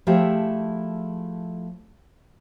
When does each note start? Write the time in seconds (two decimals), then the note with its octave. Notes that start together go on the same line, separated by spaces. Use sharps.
0.07 F3 A3 E4 G4 G#4 E5